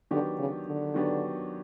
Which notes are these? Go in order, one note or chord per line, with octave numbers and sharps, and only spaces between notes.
D3 D#3 F#3 B3 D4 G4
C#3
D3
D#3 F#3 B3 D4 G4